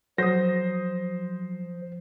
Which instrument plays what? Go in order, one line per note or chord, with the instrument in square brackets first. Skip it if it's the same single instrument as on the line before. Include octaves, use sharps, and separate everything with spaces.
[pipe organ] F3 [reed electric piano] F#3 [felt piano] C5 [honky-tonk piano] D#6 A#6